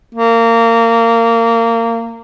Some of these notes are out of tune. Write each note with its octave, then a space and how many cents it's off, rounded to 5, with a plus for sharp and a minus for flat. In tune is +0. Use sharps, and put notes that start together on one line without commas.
A#3 -25